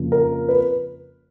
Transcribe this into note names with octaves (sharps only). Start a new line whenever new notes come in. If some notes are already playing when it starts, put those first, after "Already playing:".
Already playing: F2 C#3 F3 A#3
A#4
B4